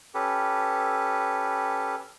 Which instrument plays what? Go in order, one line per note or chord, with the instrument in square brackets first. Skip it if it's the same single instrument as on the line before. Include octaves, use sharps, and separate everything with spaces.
[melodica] C#4 G4 A4 B4